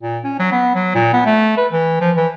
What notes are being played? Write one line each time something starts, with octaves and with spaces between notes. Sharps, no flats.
A#2
C#4
F#3
B3
F#3
A#2
B3
A3
B4
E3
F3
E3